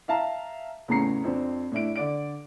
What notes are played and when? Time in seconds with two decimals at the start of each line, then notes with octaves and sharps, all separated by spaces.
0.08 E5 F5 A5 A#5
0.88 E2 A2 C#3 A#5 C7 C#7
1.24 F2 C4 D4
1.72 A2 D4 E4 D7
1.96 D3 D5 D7